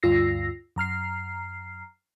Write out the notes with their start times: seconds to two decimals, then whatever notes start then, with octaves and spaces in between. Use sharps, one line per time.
0.03 D2 G2 F4 E6 A#6 C7
0.76 F#2 A#5 F6 C7